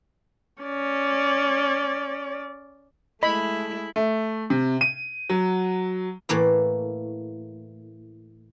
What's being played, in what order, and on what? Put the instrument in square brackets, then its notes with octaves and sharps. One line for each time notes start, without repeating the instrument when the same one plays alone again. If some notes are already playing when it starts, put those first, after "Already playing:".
[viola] C#4 D5
[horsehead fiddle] G#3 A3 [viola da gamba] E4 [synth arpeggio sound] D#5 [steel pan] B5
[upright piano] A3
C3
D#7
F#3
[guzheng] A2 E3 A#3 E4